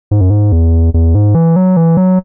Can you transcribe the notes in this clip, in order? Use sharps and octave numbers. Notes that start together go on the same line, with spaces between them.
G#2
F#2
G#2
E2
E2
G#2
E3
F#3
E3
F#3